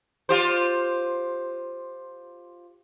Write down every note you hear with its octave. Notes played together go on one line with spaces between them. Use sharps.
F4 G4 C5